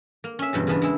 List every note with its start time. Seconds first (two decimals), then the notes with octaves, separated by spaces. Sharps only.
0.24 A#3
0.39 C#4 E5
0.53 E2 G2 B2 F#3
0.67 C#3 E3 A#3 B3 D4
0.82 G#3 E4